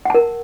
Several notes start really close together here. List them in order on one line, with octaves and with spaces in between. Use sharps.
F#5 A5 A#4